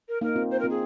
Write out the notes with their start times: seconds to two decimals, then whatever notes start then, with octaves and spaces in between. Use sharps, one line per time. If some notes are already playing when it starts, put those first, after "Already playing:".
0.08 A#4
0.21 A#3 D#4 A#4
0.36 C4 F4
0.50 C5
0.59 A#4
0.64 C4 F4
0.69 G#4